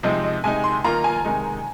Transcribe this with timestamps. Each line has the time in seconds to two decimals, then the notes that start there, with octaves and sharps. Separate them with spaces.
0.03 C3 F3 G#3 C4 D#4 D#5
0.24 D#5
0.44 C3 G#3 D#4 G#5
0.64 C6
0.84 D#3 A#3 F4 A#5
1.04 G#5
1.25 C3 D#3 G#3 D#4